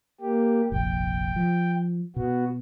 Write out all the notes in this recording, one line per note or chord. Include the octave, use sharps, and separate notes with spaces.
A#3 G4
F1 A#1 G5
F3
B2 B3 F#4